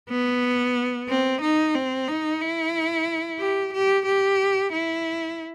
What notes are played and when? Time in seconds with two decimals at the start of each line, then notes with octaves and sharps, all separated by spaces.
0.10 B3
1.09 C4
1.41 D#4
1.75 C4
2.08 D#4
2.41 E4
3.39 G4
3.73 G4
4.06 G4
4.73 E4